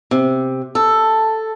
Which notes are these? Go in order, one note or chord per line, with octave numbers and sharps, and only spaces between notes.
C3
A4